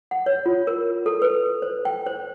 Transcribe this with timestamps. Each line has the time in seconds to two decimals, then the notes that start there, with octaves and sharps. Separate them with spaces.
0.11 F#5
0.26 C#5
0.46 F4
0.67 A#4
1.06 A4
1.22 B4
1.62 C5
1.85 G5
2.06 C5